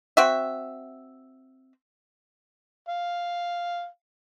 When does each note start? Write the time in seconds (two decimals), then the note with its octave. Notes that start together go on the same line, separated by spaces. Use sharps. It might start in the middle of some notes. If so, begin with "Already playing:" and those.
0.17 C4 F#4 E5
2.88 F5